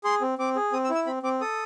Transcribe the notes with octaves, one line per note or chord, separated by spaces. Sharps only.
G#4 C6
C4
C4 D6
G#4
C4 D#6
E6
E4
E6
C4 B5
C4 D6
A4 D#6